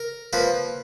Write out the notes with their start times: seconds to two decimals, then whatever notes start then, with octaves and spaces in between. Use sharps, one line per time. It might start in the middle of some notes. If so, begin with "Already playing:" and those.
Already playing: A#4
0.33 F3 A#3 B4